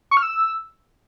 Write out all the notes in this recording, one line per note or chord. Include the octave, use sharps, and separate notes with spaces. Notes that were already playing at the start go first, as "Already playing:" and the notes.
C#6
F6
E6